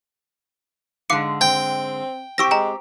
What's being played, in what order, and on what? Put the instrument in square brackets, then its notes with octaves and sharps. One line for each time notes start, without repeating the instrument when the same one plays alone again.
[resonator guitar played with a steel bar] G#2 D3 G#3 [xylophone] F5 D6 C#7
[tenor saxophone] C4 [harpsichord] G5
[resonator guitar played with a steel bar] C4 G4 [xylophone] C#6 E6 A#6
[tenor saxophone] G#3 [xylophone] G5 A#5